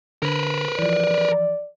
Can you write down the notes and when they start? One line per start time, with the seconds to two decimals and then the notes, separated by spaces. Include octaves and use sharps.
0.23 D3 A#4 B4
0.79 E3 F3 D5